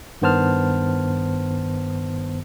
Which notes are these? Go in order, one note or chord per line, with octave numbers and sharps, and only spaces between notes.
G2 D#3 B3 C5 A5 F6